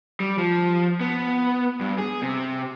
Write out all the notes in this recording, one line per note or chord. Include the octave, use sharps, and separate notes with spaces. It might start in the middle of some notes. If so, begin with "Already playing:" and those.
G3
F3
B3
G2
G#4
C3